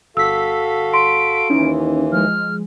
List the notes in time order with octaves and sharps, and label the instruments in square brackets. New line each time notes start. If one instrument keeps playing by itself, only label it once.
[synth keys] G1 B6 [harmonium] F#4 A4 F5 [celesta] E6
[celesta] C6 [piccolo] D7
[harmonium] D#2 E3 [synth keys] C#4 D#4 E4
[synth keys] F3 G#3 [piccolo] F6